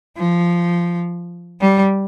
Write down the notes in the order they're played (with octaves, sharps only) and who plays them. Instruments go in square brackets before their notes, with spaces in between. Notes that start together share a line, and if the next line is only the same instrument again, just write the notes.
[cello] F3
G3